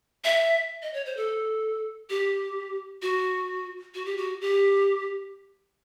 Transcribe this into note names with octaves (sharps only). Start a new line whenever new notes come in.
E5
D#5
C#5
C5
A4
G4
F#4
F#4
G4
F#4
G4